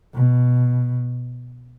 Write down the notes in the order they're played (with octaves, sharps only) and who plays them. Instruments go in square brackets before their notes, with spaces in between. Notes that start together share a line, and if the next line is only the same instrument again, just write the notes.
[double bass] B2